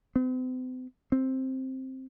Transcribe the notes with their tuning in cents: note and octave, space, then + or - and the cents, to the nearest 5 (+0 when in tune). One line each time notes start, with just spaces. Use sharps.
C4 -45
C4 +5